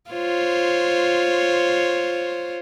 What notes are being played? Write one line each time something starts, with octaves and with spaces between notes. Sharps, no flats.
F4 C5 C#5